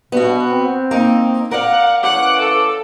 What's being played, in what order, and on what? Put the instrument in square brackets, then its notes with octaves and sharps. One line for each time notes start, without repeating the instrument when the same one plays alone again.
[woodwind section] G2 B2 [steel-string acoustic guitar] B3 F#4
[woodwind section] C4
[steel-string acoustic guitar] A#3 D#4
[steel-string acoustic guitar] A#4 D5 F5 [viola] F#5
[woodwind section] E3 C#4 D6 [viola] F#5
[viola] A4